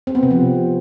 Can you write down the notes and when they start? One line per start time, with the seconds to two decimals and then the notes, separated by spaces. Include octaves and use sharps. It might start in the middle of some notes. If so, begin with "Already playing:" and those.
0.07 C4
0.15 B3
0.23 C3
0.31 F3